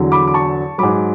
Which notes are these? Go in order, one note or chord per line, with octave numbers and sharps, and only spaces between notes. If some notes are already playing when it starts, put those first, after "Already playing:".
Already playing: E2 D3 F#3
B5 D6
D6
A5 C#6
G#2 F#3 B5 D6